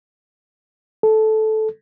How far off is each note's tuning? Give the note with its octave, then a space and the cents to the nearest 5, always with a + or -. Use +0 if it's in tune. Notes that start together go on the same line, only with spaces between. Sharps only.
A4 -15